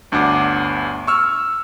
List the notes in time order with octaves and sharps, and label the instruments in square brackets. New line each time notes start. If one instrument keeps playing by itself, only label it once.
[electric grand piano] G1 D2 D4 F#5 D6
C#6 E6 F6